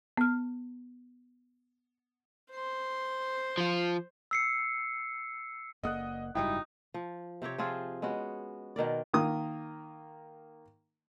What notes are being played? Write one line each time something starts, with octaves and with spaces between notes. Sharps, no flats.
B3 F6
C5 C6
F3 F4
E6 C7 C#7
F#1 A#3 A4 D5 D#5 F#5 D#6 F#6
F#1 G#2 G3 D#4 E4 F#4 G5
F3
C3 C4 G4 C#5
F3 C4 F4 G#4
G#3 B3 C#4 F#4
B2 D#3 A#4 D5
D#3 A#3 D#6